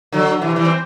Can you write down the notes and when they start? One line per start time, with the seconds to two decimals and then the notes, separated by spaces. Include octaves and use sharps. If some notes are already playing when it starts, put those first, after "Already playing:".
0.12 D3 F#3
0.41 C3 E3
0.56 E3 G3
0.65 C4